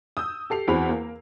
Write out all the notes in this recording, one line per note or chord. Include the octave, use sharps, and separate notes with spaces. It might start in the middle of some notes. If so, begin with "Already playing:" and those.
D#6 E6 G6
G4 A4 C7 F7
E2 C4 F#4 G#4 B5 F7
A#3